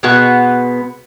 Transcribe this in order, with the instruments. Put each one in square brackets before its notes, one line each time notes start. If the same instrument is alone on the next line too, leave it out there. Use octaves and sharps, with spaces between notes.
[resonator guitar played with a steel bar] B2 G#3 B3 F#4